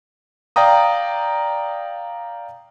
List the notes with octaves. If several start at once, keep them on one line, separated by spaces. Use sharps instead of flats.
D5 F5 G5 A#5 D#6